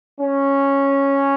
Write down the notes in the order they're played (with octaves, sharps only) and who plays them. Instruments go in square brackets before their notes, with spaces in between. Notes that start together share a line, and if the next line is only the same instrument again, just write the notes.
[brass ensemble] C#4